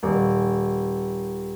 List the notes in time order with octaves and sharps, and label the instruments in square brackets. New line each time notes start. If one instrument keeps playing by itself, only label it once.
[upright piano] D#1